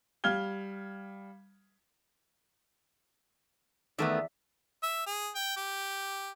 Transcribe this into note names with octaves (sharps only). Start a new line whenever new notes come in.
G3 F5 F6 G#6 G7
E2 D#3 A3 B3 D5 E5
E5
G#4
G5
G4